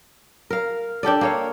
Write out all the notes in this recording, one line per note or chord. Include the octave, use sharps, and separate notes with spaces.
A#4 F5
D4 G4 A4 D5
A#3 C#5 F5